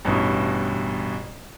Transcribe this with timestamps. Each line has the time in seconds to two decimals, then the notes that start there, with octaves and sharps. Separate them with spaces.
0.05 A1 G2 B2 E3